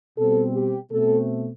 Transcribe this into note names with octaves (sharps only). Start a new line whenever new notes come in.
B2 G3 C4 A4
G4
B2 A3 C4 A4